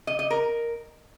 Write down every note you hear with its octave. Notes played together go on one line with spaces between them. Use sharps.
D#5
D#5
A#4